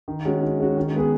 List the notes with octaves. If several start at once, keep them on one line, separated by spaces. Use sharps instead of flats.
D#3
G#3 C#4 F#4
D#3
G#3 C#4 F#4
D#3
G#3 B3 G#4